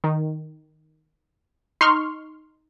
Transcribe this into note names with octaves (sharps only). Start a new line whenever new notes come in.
D#3
D#4 C6 C#6 F6